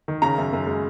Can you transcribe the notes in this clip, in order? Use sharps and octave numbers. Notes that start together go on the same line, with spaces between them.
D#3
C#3 A#5
F#2
F#2
G#3